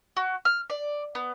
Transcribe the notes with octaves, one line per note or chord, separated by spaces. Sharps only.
F#4
F6
D5
B3